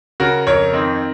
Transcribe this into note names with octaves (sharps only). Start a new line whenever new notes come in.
C#3 F#4 A#4
F2 A#4 C#5
D#3 C4 D#4